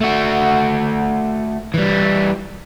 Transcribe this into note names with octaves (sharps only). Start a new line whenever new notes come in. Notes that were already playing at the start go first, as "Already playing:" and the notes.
A3 F#4
E3 G3